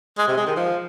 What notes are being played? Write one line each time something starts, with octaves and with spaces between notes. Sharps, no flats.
G#3
C3
G#3
D#3
F3